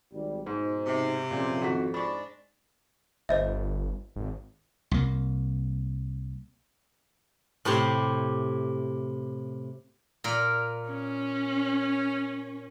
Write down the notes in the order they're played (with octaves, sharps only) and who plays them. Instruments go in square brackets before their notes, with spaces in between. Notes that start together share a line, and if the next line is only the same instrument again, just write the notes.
[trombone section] G#1 G3
[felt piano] G#2 [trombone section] B2 D#4 C5
[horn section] C3
[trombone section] F2 [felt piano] A#2 C#3
[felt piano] G#1 F#4 B6
[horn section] G#2 D4 [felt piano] B5 C#6
[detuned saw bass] G1 [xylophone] C5 D#5 E5
[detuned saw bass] G#1
[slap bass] C2 A#3
[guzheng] A2 C3 E4 G4 C6
A#2 A#4
[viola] C#4